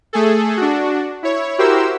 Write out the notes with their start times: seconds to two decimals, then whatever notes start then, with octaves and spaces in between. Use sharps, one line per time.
0.13 A3 G#4 A4
0.57 D4 F#4
1.23 E4 C#5
1.58 E4 F#4 G4 A#4 C5 E6